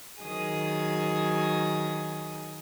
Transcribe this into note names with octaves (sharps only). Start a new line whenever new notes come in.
D#3 F#3 G#4 D#6